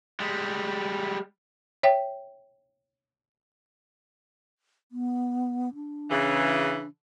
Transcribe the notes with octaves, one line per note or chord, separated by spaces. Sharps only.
G3 G#3
C#5 E5 G5
B3
D4
C#3 E3